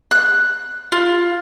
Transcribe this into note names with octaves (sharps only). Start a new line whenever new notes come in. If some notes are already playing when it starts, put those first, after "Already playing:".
F#6
F4